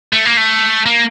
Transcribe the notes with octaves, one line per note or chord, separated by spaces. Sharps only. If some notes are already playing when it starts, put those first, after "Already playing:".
A3
A#3
A3
A#3